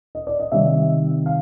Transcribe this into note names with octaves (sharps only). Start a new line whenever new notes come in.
D#5
D5
D#5
C3 D#3 G3 E5
F5